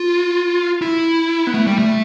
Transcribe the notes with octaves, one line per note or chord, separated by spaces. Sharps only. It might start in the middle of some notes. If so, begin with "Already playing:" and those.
Already playing: F4
E4
B3
A3
G3
A3